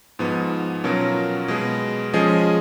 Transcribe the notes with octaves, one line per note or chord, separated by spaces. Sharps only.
G#2 F3 B3 D#4
B2 F#3 C#4 F4 A#4
B2 G#3 B3
F3 G#3 C#4 G#4 D#5